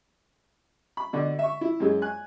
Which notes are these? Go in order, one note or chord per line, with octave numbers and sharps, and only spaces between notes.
B5
B2 D3
E5 C#6
E4
F#2 G#3
G#5 F#6